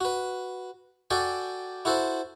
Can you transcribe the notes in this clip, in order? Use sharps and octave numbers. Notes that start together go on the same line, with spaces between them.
F#4 B4
F#4 A4 D5 G5 G#5
E4 F#4 A4 C5